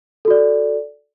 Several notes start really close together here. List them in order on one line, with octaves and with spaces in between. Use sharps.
A4 F#4 D5